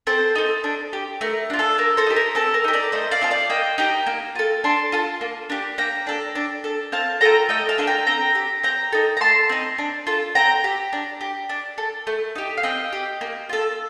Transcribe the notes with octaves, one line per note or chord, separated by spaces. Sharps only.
C4 A4 C5
D#4 A4
D4
G4
A3 A#4
D4 F4
A4
A#3 A#4
A4 C5
D#4 G4
A#4
C4 A4
A#4
D#4 G4
A#4 D5
A3 C5 D#5
D5 F5
C4 F4 A4
D5 F5
A#3 D#5 G5
D#4 G4 G5 A#5
A#3
F4 A4
D4 A5 C6
F4 A4
A#3
D4 G4
A#3 G5 A#5
D4 A4
D4
A4
C4 F5 A5
F4 A4 G5 A#5
A3 D#5 G5
F5 A5
D4 F4 A4
G5 A#5
C4 G5 A#5
G4
C4 G5 A#5
D#4 A4
A#5
A3 A5 C6
C4 D#4
D4
F4 A4
C4 G5 A#5
G4
D4
G4
D4
A4
A3
D#4 G4
F5
C4 D#5 G5
G4
A#3
F4 A4